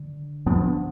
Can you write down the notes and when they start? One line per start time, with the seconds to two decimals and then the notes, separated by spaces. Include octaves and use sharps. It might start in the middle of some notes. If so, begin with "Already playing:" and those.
Already playing: D3
0.46 A2 F3 B3 D4